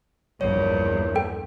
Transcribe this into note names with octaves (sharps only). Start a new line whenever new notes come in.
A#1 E2 G2 C#5
A4 G5